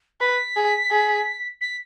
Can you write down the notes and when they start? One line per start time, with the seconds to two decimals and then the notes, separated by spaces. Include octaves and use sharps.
0.21 B4 B6
0.56 G#4
0.91 G#4
1.61 B6